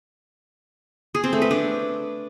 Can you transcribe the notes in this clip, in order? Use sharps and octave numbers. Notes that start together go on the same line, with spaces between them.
G#4
C4
A3
B4
D4